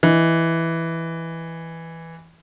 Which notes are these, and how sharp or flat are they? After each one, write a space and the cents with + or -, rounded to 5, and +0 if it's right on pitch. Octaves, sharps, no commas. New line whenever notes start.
E3 +0 D#5 +0